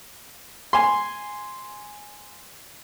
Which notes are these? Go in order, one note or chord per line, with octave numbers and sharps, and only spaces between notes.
G#5 C6